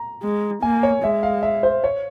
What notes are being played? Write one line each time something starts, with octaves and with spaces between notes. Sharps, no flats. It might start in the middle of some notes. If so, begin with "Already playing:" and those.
Already playing: A#5
G#3
A#3 G#5
C#5
G#3 E5
F5
E5
C5
C#5